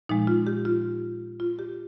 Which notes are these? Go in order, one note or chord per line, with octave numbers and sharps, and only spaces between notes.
A#2 F3 G#3 D#4
F4
G4
F4
F4
G4